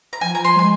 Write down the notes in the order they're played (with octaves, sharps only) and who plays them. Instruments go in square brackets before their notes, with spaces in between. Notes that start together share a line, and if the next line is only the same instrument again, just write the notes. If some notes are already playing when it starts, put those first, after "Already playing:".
[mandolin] A#5
[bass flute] F3 [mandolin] G#5
[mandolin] A#5
C6
[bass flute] G#3 [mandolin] G#5